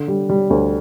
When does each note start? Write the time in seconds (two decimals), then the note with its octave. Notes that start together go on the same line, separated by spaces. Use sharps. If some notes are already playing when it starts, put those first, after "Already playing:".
Already playing: D3
0.08 G3
0.29 G3
0.50 D2